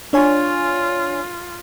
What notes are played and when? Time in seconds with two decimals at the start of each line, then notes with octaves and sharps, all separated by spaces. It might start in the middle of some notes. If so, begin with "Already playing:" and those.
0.13 D4 F4 C#5 G#5